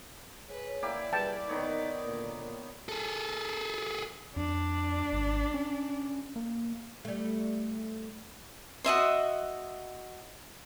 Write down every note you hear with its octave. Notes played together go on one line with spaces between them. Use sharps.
G#4 B4 C#5
A#3 E4 G4 D5
G3 G#4 B4 G5 A5
D#3 B3 D#4 A#4 C#5
A#2 D3 A#3
G#4 A4
F2 D4
G#1
C#4
A#3
G3 A3
F#4 D#5 E5 C6